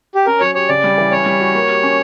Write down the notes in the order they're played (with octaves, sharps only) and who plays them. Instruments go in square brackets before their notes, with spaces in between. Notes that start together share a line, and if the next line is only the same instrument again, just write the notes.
[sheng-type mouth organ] G4
[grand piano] C#4 [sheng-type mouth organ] A#4
[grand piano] F#3 [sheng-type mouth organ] C#5
[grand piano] G4 [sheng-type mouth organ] C#5
[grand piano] C#3 [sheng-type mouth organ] D5
[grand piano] G3
E3
[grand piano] C#4 [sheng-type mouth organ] C#5
[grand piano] G3
F#4
A#3
G4
C#4